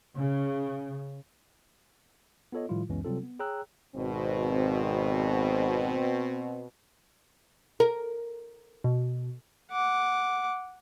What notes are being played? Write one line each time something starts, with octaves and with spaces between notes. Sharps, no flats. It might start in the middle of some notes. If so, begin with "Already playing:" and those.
C#3
B3 F4 A4 C#5 D#5
A2 D#3 F3 G3 E4 F4
C#2 F#2 E3 G#3 B3 C#4
C3 F#3 G3 C4 F4 A4
B3
G#4 C#5 G5 A#5 E6 F#6
G#1 B2 C4
A#4
B2
F#5 D6